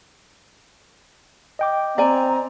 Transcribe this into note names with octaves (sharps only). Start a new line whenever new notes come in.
D#5 G5 D6
C4 D5 G#5 A#5